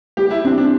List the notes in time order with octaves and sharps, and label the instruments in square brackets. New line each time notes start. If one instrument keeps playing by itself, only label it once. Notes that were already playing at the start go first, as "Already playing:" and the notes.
[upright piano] G3 [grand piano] G4
[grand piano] E4
[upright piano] C4 [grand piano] D4
[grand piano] D4